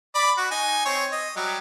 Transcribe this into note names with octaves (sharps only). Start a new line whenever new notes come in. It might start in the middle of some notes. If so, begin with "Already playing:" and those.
D5 B5
F#4
D#4 G#5
C4 C#5
D#5
F#3 G3